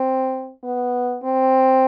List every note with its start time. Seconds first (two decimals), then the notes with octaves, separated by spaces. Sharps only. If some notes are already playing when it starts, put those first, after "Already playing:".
Already playing: C4
0.64 B3
1.24 C4